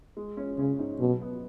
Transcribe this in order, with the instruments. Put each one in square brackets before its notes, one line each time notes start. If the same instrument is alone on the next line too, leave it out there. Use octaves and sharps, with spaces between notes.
[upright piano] G#3
C#4
[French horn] C#3 [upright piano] C#4
[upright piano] G#2
[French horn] B2 [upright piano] F#3
[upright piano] B3